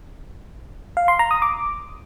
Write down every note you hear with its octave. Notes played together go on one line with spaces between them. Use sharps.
F5
C6
A#5
D#6
D6